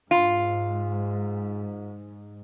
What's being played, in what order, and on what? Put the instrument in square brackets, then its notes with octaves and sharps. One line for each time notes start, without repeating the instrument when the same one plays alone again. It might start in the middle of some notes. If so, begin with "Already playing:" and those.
[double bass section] G#2 [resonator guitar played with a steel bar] F4